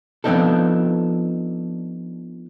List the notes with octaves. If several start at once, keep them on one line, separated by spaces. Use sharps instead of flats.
F3 B3 C4 D4 D#4 A4